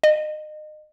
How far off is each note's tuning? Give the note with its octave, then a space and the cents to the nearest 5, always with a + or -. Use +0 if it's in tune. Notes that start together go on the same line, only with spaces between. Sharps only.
D#5 -30